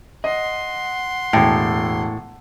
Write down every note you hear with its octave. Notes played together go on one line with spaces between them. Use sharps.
D#5 F#5 C6
E1 A2 G5